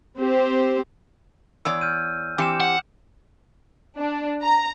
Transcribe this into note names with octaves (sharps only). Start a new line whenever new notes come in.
C4 G4 C5
E2 C#5 D5 E6
F6 G6 D#7
E3 C4 G4 D6 C#7 E7
F#5
D4
A#5